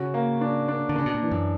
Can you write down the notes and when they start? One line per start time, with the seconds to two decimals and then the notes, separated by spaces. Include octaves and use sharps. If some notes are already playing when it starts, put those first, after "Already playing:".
Already playing: C#3 C#4 F#4
0.14 A#3
0.41 D4
0.68 D4
0.89 D3
0.96 C#3 D4
1.06 B2
1.14 A#2
1.23 E3
1.31 F#2